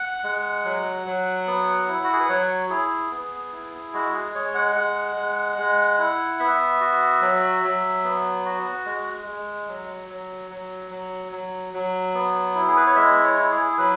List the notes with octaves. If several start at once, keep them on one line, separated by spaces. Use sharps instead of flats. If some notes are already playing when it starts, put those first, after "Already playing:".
Already playing: F#5
G#3
F#3
F#3
B3
E4
F#4
G#4
B4
F#3 C#5
E4 G#4
B3
E4
G#3 F#4
G#4
G#3 C#5
F#5
G#3 F#5
G#3
G#3
E4
B3 E5
F#4
F#3
F#3
B3
F#4
G#3
G#3
F#3
F#3
F#3
F#3
F#3
F#3
B3
E4
G#4
B4
C#5
G#3 E5
C#5
E4
G#4
F#3 B4